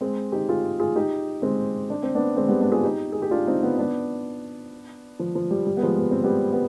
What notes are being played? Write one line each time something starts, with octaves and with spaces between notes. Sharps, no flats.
G#3 C4
D#4 G4
F4 G#4
F4 G#4
D#4 G4
G#3 C4
D4
C4
B3 D4
G#3 C4
G3 B3
B3 D4
F4 G#4
D#4 G4
G#4
G4
D4 F4
C4 D#4
B3 D4
B3 D4
F3
F3
G3
G3
B3
F3 G#3
B3
C4
G3 B3
B3